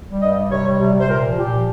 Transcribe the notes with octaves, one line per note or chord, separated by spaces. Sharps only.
G3
G2 D#5
G3
C3 C#5
G3
C3
C3
C5
A#2 A#4
F3
A#2 G4
F3